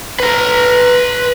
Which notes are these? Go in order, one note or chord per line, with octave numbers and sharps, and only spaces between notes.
B4 A#5